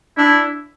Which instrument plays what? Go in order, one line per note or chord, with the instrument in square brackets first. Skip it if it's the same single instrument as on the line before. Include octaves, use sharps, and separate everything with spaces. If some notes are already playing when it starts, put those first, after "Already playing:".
[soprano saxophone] D4 [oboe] E4